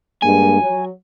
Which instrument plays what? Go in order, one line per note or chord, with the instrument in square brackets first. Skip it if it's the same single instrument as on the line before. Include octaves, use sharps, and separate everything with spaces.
[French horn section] G2 G#3 A#3 [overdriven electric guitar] G#5
[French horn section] F#3